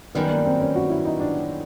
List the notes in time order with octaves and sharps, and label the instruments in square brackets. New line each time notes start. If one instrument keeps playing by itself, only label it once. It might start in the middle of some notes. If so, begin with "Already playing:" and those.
[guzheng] F#2 D#3 G3 [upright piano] B3
[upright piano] A#3
C4
C#4
F#4
E4
D#4
D4